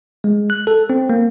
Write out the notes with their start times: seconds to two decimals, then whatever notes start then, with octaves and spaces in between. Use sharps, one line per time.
0.24 G#3
0.50 F#6
0.67 A4
0.90 C4
1.10 A#3